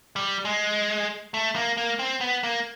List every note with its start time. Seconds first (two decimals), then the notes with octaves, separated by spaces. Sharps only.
0.16 G3
0.45 G#3
1.34 A3
1.56 A#3
1.77 A#3
1.99 C4
2.21 B3
2.43 A#3